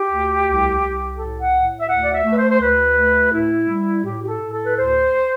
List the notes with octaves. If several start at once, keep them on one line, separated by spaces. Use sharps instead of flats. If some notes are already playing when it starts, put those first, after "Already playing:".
Already playing: G4
D2
C2
C2
A2 A4
F#5
A2
E5
D2 F#5
D5
E5
A3
B4
C5
C5
D2 B4
A3
A2 E4
G3
A2 G4
G4
A4
A2
A4
B4
D2 C5